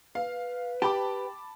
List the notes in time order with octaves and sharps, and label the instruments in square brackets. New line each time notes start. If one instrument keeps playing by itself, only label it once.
[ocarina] B4 [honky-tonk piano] F5
[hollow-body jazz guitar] G4 [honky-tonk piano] A5 B5 D6